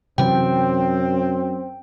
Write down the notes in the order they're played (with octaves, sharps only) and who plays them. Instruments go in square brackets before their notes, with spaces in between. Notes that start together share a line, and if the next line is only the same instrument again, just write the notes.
[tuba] F#2 [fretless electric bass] C3 E3 F#3 [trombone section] C4 [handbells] G5